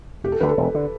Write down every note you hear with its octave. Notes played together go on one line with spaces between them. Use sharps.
E1 G4
A4
D2 D3 B4
A4
E1
D3